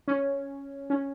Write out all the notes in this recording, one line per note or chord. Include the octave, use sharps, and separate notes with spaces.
C#4
C#4